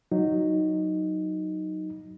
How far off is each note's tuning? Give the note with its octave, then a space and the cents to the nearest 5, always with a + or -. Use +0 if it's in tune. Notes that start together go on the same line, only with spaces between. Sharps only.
F#3 +0 D#4 +5